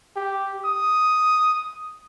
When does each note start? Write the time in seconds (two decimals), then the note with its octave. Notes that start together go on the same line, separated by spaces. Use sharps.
0.16 G4
0.65 D#6